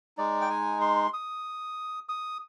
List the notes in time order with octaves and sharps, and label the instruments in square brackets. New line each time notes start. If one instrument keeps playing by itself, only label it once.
[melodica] G#3 D#4 D5
G5
G#5
C6
D#6
D#6